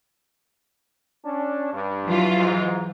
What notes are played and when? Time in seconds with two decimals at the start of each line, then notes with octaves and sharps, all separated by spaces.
1.25 C#4 D4
1.74 G2
2.06 E3 F#3 F4
2.36 G#2